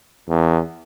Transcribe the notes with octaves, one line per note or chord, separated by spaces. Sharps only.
E2